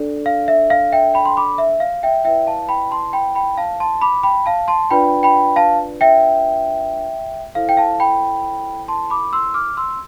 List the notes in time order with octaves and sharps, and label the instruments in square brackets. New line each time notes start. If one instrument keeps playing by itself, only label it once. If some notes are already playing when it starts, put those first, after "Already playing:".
Already playing: [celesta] D4 A4 D5
F5
E5
F5
E5 G5
G5 B5
C6
B5 D6
E5
F5
E5 G5
E4 B4 D5 E5 G5
F5 A5
G5 B5
A5 C6
G5 B5
G5 B5
F5 A5
A5 C6
B5 D6
G5 B5
F5 A5
A5 C6
D4 F4 B4 D5 G5 B5
G5 B5
F5 A5
E5 G5
E4 A4 C5 F5
G5
F5 A5
G5 B5
A5 C6
B5 D6
C6 E6
D6 F6
C6 E6